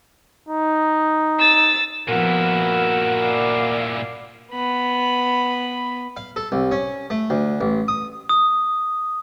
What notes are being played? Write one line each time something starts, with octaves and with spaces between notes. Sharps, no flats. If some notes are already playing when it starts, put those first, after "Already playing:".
D#4
E6 A6
A#2 F3 B3 E4 F#4 A#4
D5 F5
B3 B5
F5
A4
C2
C#4
A3
D2
A1
D#6
D#6